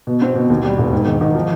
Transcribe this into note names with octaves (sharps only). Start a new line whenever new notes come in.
B2
C4
B2
D#2
G3
E1
G#2
D#3
D#3
F3